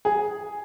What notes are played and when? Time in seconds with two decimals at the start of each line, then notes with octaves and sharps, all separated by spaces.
0.05 G#4